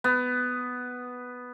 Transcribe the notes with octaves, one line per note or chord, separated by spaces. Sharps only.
B3